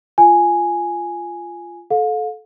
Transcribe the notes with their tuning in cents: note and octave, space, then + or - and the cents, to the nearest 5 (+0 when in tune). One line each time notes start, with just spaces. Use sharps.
F4 -10 G#5 +0
A4 -20 F5 +35